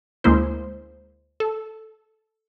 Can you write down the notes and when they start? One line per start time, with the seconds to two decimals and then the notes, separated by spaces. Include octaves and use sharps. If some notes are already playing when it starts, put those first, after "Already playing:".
0.24 D2 G#3 A#3 E4 C5
1.40 A4